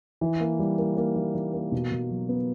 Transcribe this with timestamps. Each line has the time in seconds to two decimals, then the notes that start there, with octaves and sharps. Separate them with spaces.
0.21 E3
0.40 A#3
0.59 G3
0.78 A#3
0.97 A#3
1.16 E3
1.35 E3
1.54 A#3
1.72 B2
1.92 B2
2.10 F#3
2.29 B3